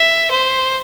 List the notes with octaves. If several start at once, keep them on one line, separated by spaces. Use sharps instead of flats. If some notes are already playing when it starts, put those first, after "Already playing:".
Already playing: E5
C5